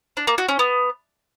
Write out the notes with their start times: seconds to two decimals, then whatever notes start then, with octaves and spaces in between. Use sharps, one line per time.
0.17 D4
0.27 A#3
0.38 F#4
0.49 C#4
0.59 B3